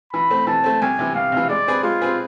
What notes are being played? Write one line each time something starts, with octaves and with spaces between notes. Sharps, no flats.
E3 B5
A3 C4
E3 A5
A3 C4
C2 G#5
C3 E3
C2 F5
C3 E3
G#3 D5
C4 G#4 B4
G#3 F4
C4 G#4 B4